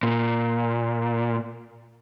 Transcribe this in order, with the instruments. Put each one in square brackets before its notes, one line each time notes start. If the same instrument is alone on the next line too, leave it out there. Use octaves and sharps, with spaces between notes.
[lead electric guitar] A#2